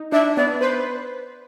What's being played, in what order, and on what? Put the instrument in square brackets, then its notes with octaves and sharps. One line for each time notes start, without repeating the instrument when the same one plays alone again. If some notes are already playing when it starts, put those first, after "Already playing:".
Already playing: [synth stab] D#4
[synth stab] D4 [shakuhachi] E5
[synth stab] B3 [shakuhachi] D5
[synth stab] B4 [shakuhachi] C5